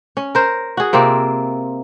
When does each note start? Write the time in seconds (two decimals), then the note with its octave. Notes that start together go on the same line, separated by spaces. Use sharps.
0.17 C#4
0.35 A#4 C5
0.77 F#4 G#4
0.93 C3 A#3 C4 F4